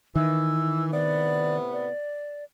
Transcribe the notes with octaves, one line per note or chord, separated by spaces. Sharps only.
D#3 E3 E6
A2 C3 B3 D5
D5